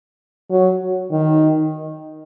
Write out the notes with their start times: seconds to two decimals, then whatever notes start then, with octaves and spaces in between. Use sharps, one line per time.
0.51 F#3
1.11 D#3